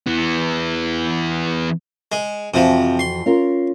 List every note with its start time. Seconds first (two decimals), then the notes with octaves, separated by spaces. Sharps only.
0.07 E3 B3
2.12 G#3
2.54 F2 C3 E3 F3 F#4
2.99 C6
3.26 C#4 F4 A#4